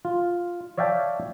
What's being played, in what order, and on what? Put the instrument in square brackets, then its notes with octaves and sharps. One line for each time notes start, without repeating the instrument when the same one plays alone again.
[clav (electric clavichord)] F4
C#5 D5 E5 F5 G5 A5